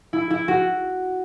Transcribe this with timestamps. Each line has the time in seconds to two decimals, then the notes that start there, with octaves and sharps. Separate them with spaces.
0.13 E4
0.30 E4
0.48 F#4